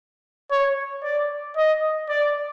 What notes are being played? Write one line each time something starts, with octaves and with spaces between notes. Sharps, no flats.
C#5
D5
D#5
D5